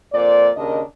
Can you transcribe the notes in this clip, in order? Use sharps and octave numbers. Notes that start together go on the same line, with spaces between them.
F2 A#2 C5 D5
D#2 C#3 D4 A#4 D#5